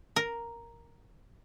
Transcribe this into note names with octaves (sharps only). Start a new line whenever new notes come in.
A#4